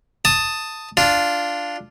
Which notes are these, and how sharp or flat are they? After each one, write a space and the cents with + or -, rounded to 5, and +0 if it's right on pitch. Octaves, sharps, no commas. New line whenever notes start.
A5 +10 D#6 +0
D4 +0 F4 +0